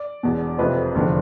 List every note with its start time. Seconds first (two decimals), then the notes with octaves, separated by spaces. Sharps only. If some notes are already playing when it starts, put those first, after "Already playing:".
Already playing: D5
0.23 E1 E2 B2
0.58 F1 F2 C3 F3 B4
0.95 F1 E2 D3 F3